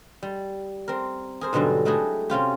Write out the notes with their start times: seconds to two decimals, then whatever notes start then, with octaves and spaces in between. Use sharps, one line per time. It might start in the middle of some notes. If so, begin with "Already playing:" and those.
0.23 G3
0.88 C4 A#4
1.41 G#4 A#4 C5
1.53 G#2 B2 D3 F#3 G3
1.85 F#3 G#3 A3 E4 G4 G#4
2.30 C3 C#4 F4 G4